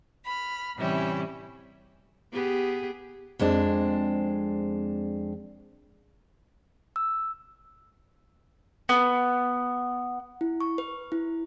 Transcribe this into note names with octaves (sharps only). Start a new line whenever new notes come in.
B5 F6
A2 C3 E3 G3 C#4 E4
B3 G4 G#4
F2 G#3 C4 D4
E6
B3
E4
C#6
B4
E4